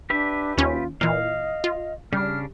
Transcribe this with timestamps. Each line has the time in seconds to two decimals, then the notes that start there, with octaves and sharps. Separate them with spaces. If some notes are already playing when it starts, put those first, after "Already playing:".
0.10 D4 G4 B4 E5
0.58 D#2 C#4 F4
1.01 A#2 E3 D#5 F5
1.64 F4
2.13 C#3 G3 D4 F6